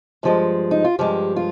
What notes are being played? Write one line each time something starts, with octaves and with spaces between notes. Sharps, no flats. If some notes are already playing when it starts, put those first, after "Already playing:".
G2 F3 G#3
D#4
F4
G2 F3 G#3 G4
F4